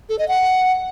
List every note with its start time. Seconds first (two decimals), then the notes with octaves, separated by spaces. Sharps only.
0.09 A4
0.19 D#5
0.28 F#5